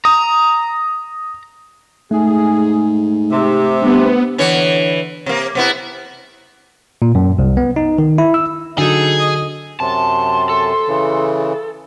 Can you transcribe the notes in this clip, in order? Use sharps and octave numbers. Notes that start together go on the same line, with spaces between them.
A#5 D#6
G#2 A3 G#4
C3
G2 B3
D3 E3 C#5
C3 A#3
C3 B3 E4
A#2
F#2
C2
B3
D#4
D#3
E4
E6
D3 F#3 D#4 G#4 A4
D#5
F#2 C3 A5 C6
A4
C#3 E3